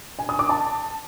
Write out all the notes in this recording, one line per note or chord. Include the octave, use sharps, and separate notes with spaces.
G#5
D#6
D6
A5